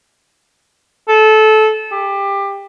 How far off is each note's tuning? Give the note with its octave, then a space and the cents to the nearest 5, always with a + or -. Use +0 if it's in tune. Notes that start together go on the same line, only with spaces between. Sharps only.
A4 -20
G4 +20